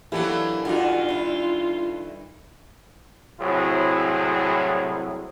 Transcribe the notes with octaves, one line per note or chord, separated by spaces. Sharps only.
E3 F#3 A#3 B3 D4 E4 G4 A4
G2 D#3 D#4 F4 F#4 D5 G#5
D4 E4
C2 A2 F#3 C4 E4 G#4